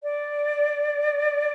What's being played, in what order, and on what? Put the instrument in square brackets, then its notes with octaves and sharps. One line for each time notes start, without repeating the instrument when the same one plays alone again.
[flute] D5